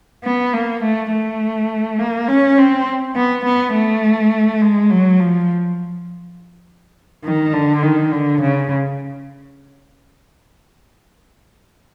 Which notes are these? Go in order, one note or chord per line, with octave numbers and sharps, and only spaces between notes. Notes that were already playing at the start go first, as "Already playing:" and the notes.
B3
A#3
A3
A3
A#3
C#4
C4
B3
B3
A3
G#3
F#3
F3
D#3
D3
D#3
D3
C#3